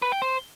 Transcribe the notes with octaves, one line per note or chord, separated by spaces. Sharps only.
B4
G5
C5